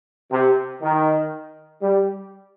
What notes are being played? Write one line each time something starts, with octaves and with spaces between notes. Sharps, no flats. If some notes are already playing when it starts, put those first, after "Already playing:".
C3
D#3
G3